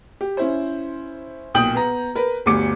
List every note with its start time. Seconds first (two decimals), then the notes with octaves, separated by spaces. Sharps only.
0.21 G4
0.37 C#4 E4 C5
1.54 B1 A#2 G5 D#6 G6 F#7
1.75 B3 A#5
2.15 A#4 B4
2.46 G1 D2 G3 F#4 D6 C#7